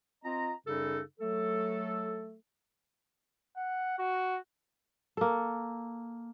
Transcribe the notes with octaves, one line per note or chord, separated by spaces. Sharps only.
C4 F4 D#5 A#5
F#2 C#3 G3 D#4 A4
F#3 A3 A4
F#5
F#4
A#3 A4